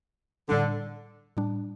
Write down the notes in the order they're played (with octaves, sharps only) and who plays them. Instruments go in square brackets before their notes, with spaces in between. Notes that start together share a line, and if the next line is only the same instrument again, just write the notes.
[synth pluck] A2 G3 D4 [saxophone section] D3
[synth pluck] A2 G3 D4